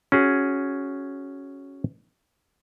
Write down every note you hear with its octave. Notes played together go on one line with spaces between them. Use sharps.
C#4 F#4 G#4